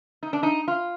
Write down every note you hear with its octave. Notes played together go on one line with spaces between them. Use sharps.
D#4
D4
D#4
F4